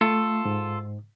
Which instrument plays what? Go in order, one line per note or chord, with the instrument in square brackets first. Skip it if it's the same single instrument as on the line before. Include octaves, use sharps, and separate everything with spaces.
[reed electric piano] A3 [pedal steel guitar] F4 A4
[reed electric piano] G#2